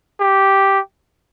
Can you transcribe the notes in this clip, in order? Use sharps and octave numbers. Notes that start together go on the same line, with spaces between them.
G4